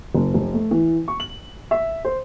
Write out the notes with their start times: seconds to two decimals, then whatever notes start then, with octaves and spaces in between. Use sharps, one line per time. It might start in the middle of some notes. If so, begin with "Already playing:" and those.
0.14 F#1
0.34 F1
0.54 A3
0.71 E3
1.08 C#6
1.20 F#7
1.71 E5
2.05 C5